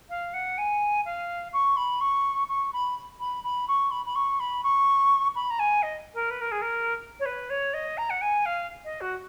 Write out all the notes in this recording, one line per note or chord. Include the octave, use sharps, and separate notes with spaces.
F5
F#5
G#5
F5
C#6
B5
C#6
C#6
B5
B5
B5
C#6
B5
B5
C#6
B5
C#6
B5
A#5
G#5
D#5
A#4
B4
A#4
G#4
A#4
C#5
B4
C#5
D#5
A#5
F#5
G#5
F5
D#5
F#4